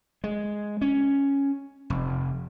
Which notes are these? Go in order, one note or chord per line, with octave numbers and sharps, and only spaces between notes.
G#3
C#4
F1